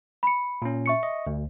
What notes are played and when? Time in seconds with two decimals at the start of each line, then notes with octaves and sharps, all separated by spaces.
0.23 B5 C#7
0.62 A#2 C#4
0.86 E5 C#6 C#7
1.03 D#5
1.27 D2